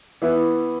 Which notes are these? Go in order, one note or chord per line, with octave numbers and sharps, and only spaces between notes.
E3 B3 E4